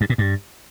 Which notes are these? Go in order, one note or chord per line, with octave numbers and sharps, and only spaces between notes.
G2
A#2
G2